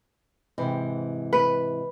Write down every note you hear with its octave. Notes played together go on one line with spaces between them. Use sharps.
G#2 C3 E3
B4